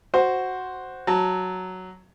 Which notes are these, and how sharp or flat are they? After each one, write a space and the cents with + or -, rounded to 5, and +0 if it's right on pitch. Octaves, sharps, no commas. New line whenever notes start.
F#4 +0 C5 +0
F#3 +0 A5 +0